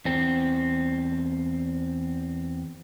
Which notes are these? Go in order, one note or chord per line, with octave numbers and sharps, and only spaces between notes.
E2 C4